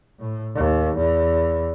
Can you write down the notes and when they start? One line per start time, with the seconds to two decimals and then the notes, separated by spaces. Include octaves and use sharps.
0.19 A2
0.55 D#2
0.97 E2